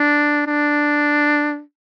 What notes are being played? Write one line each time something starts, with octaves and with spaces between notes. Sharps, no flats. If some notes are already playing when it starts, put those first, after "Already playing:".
Already playing: D4
D4